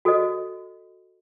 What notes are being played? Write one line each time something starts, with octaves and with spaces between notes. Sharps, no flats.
F#4 A4 C5 D#5